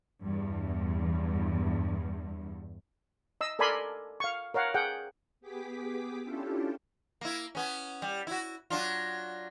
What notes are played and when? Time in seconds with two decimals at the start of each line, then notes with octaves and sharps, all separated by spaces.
0.22 E2 G2
3.41 D#5 E6
3.59 A4 A#4 D5 G#5 B5 C6
4.20 F5 C#6
4.54 A#4 C#5 F5 F#5
4.74 G#4 F#5 G5
5.41 B3 G4 G#4 D6 B6
6.22 C#4 D4 E4 F4 G4 A4
7.21 A#3 E4
7.55 B3 C#4
8.02 G3
8.27 E4 F#4
8.70 F#3 D4 F4